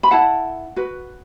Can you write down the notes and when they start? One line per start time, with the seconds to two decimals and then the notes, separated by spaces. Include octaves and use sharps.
0.03 B5
0.11 E4 A4 F#5 A5
0.76 F#4 B4